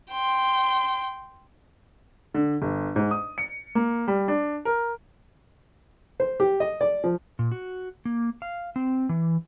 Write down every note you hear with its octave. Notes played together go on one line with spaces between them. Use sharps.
G5 C6
D3
G1
G#2
D#6
C#7
A#3
G3
D4
A#4
C5
G4
D#5
D5
F3
A#2
F#4
A#3
F5
C4
E3